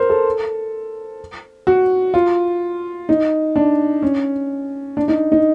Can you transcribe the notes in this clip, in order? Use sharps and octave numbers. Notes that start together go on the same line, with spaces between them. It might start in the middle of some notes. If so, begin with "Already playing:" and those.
Already playing: A#4 C5
A4
F#4
F4
D#4
D4
C#4
D4
D#4
D#4